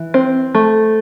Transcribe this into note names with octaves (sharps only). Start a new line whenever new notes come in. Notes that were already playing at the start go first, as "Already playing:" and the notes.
Already playing: E3
C4
A3